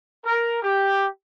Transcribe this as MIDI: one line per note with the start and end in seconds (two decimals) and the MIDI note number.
0.25 0.61 70
0.62 1.06 67